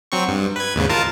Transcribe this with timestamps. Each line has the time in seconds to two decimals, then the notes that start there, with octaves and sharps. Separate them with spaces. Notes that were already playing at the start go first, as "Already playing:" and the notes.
0.12 F#3 C4 C#6
0.28 G2
0.56 B4 G#6
0.75 D#2 G#2 C#3
0.89 F4 A#4 A5